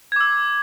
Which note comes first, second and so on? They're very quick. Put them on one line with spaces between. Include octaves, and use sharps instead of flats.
G#6 D6 E6